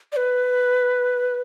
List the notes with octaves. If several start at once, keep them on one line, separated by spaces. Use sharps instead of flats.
D5
B4